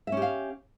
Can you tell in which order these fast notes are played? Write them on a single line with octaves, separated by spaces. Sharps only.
E5 C#4 G4 F5